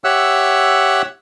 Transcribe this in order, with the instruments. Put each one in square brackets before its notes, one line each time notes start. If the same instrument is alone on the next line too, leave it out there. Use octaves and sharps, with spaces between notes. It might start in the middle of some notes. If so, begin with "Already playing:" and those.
[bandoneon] G4 C#5 E5 F#5 E6 F#6